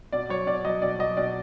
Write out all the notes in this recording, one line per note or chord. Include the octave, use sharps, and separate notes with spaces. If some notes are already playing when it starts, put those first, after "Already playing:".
B2 D5
F#3 C#5
B2 D5
F#3 D#5
B2 D5
F#3 D#5
B2 D5